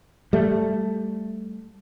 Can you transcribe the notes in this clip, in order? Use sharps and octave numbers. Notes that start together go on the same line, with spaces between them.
G3 A3